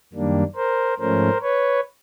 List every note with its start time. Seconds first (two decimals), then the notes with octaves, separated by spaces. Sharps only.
0.13 F#2 D#3 G3 A#3 D4
0.56 A#4 C5
1.00 G#2 F3 A3 C#4 A#4 C5
1.42 B4 C#5